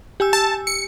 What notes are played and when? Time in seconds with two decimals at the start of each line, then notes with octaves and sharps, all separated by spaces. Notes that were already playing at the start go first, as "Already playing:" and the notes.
0.20 G4 G#5 E6
0.33 A5
0.67 C#7